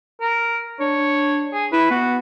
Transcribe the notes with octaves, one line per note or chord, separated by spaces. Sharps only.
A#4
D4 C#5
G#4
E4 B4
B3 F#4